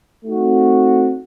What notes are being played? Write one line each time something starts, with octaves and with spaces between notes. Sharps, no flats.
A3 C4 D#4 F#4